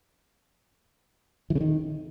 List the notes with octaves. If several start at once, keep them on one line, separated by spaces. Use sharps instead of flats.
E3
C#3
D#3